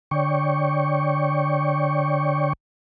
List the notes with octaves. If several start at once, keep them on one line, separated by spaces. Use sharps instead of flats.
D3 C#5 D5 G5 C#6